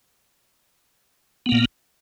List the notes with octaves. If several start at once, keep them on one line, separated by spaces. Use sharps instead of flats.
A#2 A#3 B3